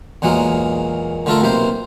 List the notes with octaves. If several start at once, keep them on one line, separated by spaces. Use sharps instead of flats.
E2 A#2 F#3 G#3 A#3
D3 A3 F4 A4 A#4
B1 C3 A#3 C5